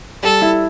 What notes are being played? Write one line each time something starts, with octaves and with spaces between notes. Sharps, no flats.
G3 A4
E4